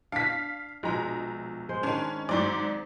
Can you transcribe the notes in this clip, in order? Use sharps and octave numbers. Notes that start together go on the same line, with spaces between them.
D4 F5 B6
A#1 B2 G#3 A#5
G#3 C5
D#3 G#3 C#4 D4
G#2 F#3 C4 D5